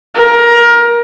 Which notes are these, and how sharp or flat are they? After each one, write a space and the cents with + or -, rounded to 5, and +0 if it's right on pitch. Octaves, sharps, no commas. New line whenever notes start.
A#4 +20